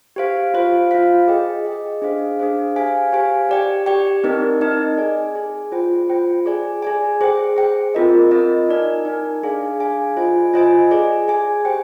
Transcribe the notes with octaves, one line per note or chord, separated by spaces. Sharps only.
G4 C5 F5
F4 C5 F5
F4 C5 F5
G#4 D#5 G5
G#4 D#5 G5
D4 G#4 C5 F5
D4 G#4 C5 F5
G4 C5 F5 G#5
G4 C5 F5 G#5
G4 D5 G5
G4 D5 G5
C4 D#4 A#4 D#5
C4 D#4 A#4 D#5
G#4 D5 G#5
G#4 D5 G#5
F4 C5 G5
F4 C5 G5
G#4 D5 G#5
G#4 D5 G#5
G#4 C5 G5
G#4 C5 G5
C4 F4 A#4 D#5
C4 F4 A#4 D#5
D#4 A#4 D5 G#5
D#4 A#4 D5 G#5
D4 G#4 D5 F5 G#5
D4 G#4 D5 F5 G#5
F4 C5 D#5 G#5
F4 C5 D#5 G#5
G#4 D5 G#5
G#4 D5 G#5
G4 C5 G5